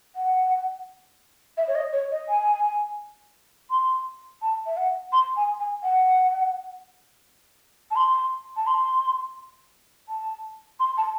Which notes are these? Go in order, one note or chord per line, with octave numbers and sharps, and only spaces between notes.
F#5
E5
C#5
D#5
C#5
D#5
G#5
C6
A5
E5
F#5
C6
G#5
G#5
F#5
A5
C6
A5
C6
A5
C6
A5